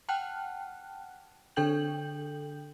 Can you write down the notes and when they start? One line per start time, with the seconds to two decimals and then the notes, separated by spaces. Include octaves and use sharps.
0.09 F#5 G5 A5 F6 F#6
1.56 D3 D4 A4 G5 G6 F#7